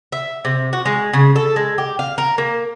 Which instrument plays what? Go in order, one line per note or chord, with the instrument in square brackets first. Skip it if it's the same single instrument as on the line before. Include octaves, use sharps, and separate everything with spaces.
[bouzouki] E5
C3
F#4
G#3
C#3
A4
G#3
G4
F5
A#4
A#3